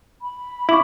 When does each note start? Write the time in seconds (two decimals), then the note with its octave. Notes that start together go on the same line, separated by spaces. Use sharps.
0.22 B5
0.69 E4 C#6 D6 F#7